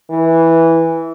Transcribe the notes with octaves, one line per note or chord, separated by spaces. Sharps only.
E3